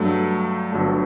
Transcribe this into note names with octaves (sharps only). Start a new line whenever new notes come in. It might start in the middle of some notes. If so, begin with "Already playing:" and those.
Already playing: G2 F#3 A3
G1 G2 F#3 A3 A4